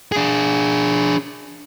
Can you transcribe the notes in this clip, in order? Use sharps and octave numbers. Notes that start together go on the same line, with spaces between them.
D4 G#4